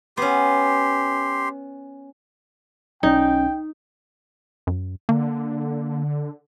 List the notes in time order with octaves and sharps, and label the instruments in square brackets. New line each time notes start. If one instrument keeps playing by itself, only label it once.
[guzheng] B3 C#4 [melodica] G4 C6
[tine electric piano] B1 C#4 [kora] D#4 [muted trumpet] G5
[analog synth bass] F#2
[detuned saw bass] D3 [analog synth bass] A#3